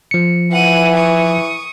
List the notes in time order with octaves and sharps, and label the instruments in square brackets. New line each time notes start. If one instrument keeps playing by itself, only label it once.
[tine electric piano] F3 C#7
[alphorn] E3 [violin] F#5 D#7
[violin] C#6 D#6